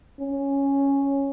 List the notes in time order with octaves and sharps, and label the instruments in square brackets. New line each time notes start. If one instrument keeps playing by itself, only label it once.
[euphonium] C#4